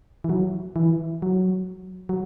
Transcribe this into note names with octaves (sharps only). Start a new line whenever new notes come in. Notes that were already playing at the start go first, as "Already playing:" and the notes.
E3
F#3
E3
F#3
F#3